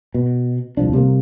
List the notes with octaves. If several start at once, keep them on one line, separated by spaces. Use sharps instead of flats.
B2
D#1 C2 F3 D4
C3 G3 A3 A#3